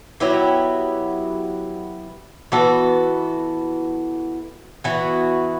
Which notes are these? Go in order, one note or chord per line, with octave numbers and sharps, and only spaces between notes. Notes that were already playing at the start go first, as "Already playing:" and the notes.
F#3 B3 E4 G4
E3 B3 F#4 A4
E3 B3 F#4